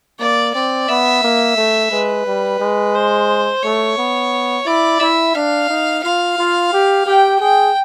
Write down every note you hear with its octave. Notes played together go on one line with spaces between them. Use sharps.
A#3 D5
C4 D5
B3 E5
A#3
A3
G#3 B4
G3
G#3
C5
A3 C#5
B3
E4 D5
E4 E5
D4 F5
D#4
F4 F5
F4
G4
G4 G5
G#4 G5